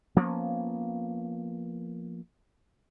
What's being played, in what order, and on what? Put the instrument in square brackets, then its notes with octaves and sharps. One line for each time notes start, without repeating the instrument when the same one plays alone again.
[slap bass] F3 A#3 B3 C#4